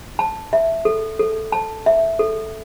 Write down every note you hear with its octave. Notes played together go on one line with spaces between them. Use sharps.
A5
E5
A4
A4
A5
E5
A4